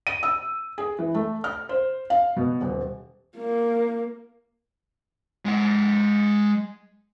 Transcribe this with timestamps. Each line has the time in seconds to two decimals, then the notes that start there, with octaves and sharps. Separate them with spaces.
0.07 D#7
0.23 E6
0.78 G#4
0.99 E3
1.15 A3
1.44 F6
1.69 C5
2.10 F5
2.36 B2
2.61 D#1
3.37 A#3
5.45 G#3 F#5